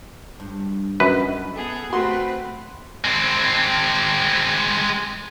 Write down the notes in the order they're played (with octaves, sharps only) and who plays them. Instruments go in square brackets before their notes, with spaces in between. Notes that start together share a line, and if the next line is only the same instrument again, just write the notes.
[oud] G2
[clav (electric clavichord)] F#2 B4 [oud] D#4
[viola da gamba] B3 G#4 A4
[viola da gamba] A3 C4 B4 [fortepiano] F#4 C6
[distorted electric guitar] G#3 C4